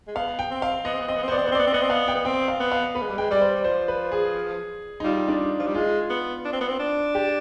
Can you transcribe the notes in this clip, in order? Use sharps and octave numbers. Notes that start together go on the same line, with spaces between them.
G#3
B3 F5
G5
C4
F5
B3 D#5
C4
B3
C4 D#5
B3
C4
B3 C5
D5
C4
B3
C5
C4
B3 D5
C4
B3 D#5
C4
B3 F5
G5
B3
C4 G5
F5
B3
F5
B3 B4
G#3
G3
G#3 G5
G3 D5
C5
G3
F3 C5
B4
G#4
D#4
G3 F4
D4
F3
G3
G#3 F4
B3
D4
C4
B3
C4
D4
G4